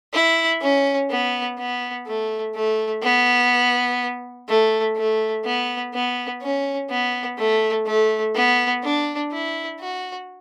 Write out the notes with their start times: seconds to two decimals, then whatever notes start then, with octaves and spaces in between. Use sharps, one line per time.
0.14 E4
0.61 C#4
1.10 B3
1.59 B3
2.07 A3
2.55 A3
3.03 B3
4.48 A3
4.97 A3
5.45 B3
5.94 B3
6.42 C#4
6.91 B3
7.38 A3
7.87 A3
8.35 B3
8.83 D4
9.32 E4
9.80 F#4